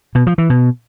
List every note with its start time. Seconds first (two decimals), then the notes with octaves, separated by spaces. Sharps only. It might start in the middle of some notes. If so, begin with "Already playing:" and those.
0.15 B2
0.27 F3
0.38 E3
0.50 B2